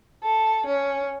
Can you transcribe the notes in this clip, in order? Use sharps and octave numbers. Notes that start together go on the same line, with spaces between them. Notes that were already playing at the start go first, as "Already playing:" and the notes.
A4
C#4